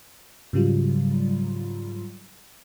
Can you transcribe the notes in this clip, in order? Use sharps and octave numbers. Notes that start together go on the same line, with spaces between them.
G#2 C#3 F#3 G3 F4